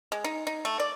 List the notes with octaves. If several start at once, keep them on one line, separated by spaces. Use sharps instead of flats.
G#3
D#4
D#4
A3
D5